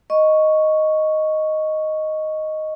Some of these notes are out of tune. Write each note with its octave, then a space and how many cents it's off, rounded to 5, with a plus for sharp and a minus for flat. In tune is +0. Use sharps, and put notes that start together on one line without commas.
D#5 +0 C#6 +0